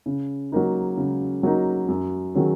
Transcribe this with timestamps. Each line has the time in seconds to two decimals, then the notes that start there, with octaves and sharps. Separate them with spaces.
0.06 C#3
0.52 F#3 A#3 D#4
0.97 C#3
1.43 F#3 A#3 D#4
1.88 F#2
2.34 D#3 F#3 C#4 G#4